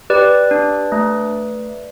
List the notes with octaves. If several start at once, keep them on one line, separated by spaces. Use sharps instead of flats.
G4 B4 D5
D4
A3